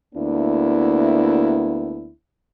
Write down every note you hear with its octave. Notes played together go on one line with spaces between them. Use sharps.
D2 A#3 B3 D4 E4